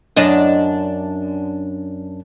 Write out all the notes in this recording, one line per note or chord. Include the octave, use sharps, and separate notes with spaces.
F#2 D4 D#5